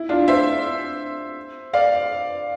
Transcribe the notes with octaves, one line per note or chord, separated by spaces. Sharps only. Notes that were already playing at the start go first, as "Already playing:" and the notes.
Already playing: E4
D4 F4
C5 E5
D5 F5